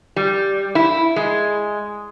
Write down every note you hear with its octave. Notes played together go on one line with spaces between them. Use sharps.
G3
E4
G#3